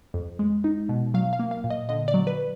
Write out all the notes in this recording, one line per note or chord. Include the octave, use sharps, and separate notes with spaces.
F2
G#3
D#4
B2
F#3 F5
F5
A#3
F5
A#2
D#5
D3 D#5
D5
F#3
B4